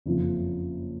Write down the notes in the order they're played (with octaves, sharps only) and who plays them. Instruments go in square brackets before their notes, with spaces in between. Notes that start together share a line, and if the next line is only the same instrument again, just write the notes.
[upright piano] F#1 F2 F3